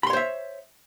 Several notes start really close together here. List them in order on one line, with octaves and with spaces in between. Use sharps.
B5 C6 C#5 C5 E5